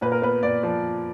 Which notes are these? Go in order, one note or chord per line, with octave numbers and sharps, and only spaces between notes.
A#2 B4
A#4
B3 B4
A#2 D5
F3